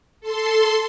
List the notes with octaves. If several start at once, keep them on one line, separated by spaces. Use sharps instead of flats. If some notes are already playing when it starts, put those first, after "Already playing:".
A4 C6